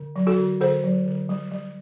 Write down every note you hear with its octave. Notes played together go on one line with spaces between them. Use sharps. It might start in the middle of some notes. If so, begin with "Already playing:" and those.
Already playing: D3
F#3
F#4 A4
D3
D3 A4 C5
F#3
D3
G3
G3